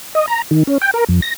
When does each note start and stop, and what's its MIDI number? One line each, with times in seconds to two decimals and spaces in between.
0.15 0.26 75
0.27 0.42 82
0.51 0.63 51
0.67 0.78 61
0.82 0.91 79
0.94 1.04 70
1.09 1.20 41
1.22 1.34 94